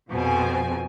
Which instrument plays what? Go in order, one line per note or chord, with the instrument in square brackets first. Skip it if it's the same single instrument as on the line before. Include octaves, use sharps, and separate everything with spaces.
[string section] A#1 F2 G#5 [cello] B2 C4